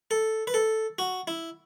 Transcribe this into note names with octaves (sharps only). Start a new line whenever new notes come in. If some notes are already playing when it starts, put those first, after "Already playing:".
A4
B4
A4
F#4
E4